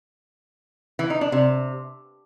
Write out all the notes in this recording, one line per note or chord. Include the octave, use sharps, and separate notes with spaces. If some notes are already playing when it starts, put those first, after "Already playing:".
E3
D#4
D4
C3